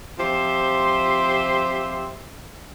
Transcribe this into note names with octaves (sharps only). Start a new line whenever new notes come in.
F3 C4 G4 C5 E5 C6